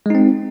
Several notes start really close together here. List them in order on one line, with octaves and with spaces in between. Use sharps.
G#3 D#4 C4